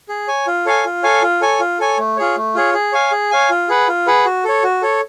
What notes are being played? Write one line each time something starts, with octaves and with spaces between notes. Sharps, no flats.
G#4
C#5 G#5
F4
A4 C#5 F5 G#5
F4
A4 C#5 F5 G#5
F4
A4 C#5 G#5
F4
A4 C#5 G#5
A3
F4 G#4 C#5
A3
F4 G#4 C#5
G#4
C#5 F5 G#5
G#4
C#5 F5 G#5
F4
G#4 B4 F#5
F4
G#4 B4 F#5
F#4
A4 C#5
F#4
A4 C#5